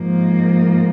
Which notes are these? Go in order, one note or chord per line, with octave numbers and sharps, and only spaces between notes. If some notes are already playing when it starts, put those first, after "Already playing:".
Already playing: G#2 F3 A#3